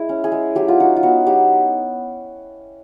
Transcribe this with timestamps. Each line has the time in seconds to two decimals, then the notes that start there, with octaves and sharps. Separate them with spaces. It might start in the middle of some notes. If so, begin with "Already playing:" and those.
Already playing: G#3 E4
0.09 C#4
0.24 G#4
0.32 G#3
0.55 F#3 G4
0.68 F4
0.80 D#4 F#4
0.96 F4
1.03 B3 F#4
1.27 F#3 G4